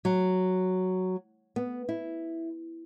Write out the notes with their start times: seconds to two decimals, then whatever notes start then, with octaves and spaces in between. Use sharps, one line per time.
0.05 F#3
1.56 B3
1.89 E4